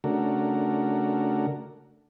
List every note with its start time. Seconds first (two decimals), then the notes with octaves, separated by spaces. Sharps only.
0.04 C#3 A3 D4 F#4 A#4